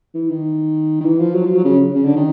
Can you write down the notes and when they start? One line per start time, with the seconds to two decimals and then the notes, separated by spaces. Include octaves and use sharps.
0.15 E3
0.30 D#3
1.01 D#3
1.05 E3
1.20 F3
1.35 F#3
1.45 F3
1.55 F#3
1.65 C#3
1.95 C#3
2.05 D3
2.16 D#3